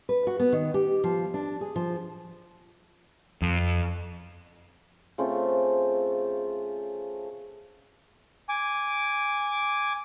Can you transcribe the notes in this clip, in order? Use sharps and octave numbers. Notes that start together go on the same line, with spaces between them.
B4
F#4
B3
D#3
G4
F3
D4
G#4
F3
F2
C#3 A3 C4 F4
G#5 D6